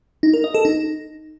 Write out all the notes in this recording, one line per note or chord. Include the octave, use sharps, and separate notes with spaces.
D#4
A#4
D#5
A4
D#4